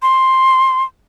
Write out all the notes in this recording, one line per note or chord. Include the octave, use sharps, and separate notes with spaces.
C6